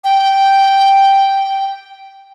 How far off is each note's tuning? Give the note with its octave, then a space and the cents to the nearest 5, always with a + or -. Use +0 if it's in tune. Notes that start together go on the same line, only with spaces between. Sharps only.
G5 -5